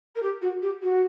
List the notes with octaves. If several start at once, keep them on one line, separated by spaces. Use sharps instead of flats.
A#4
G4
F#4
G4
F#4